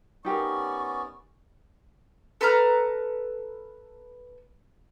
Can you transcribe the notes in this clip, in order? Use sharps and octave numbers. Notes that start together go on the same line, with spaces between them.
B3 C#4 D#4 G4 A#4 D5 C#6
A4 B4 A#5 F6